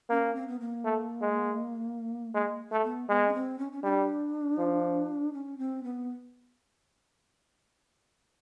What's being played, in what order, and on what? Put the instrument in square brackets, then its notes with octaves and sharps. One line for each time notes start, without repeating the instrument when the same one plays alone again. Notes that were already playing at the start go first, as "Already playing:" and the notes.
[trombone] A#3 [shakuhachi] C#4
[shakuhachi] C4
B3
A#3
[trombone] A3
G#3
[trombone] G#3 [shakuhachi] A#3
[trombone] A3
[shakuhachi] B3
[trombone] G#3 [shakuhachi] B3
[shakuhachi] C#4
C4
C#4
C#4
[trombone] G3 [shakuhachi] D4
[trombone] F3
[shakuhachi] C#4
C4
B3